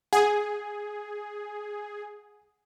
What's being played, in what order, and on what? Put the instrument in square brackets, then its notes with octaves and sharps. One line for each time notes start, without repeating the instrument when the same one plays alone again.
[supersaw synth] G#4 [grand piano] F#5 G#5